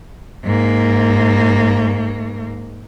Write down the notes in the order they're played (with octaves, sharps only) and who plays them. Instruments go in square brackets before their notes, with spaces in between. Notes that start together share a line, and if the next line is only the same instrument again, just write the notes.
[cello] G#2 A#3